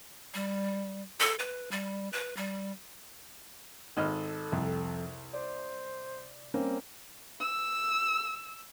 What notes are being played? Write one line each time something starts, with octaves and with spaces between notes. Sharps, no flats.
G3
A4
B4
G3
B4
G3
G#1 A4 D#5 F6
C2 F2
C5 D5
G3 A#3 C4 C#4
E6